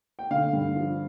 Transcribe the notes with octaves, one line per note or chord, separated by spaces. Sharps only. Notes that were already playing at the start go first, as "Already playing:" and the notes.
G5
D3 F5
G2
F3